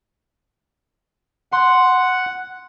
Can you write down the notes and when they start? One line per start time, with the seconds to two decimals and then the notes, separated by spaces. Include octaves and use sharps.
1.52 F#5 C6